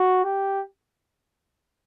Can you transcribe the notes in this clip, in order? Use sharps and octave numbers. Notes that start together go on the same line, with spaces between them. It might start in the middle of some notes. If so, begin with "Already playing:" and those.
Already playing: F#4
G4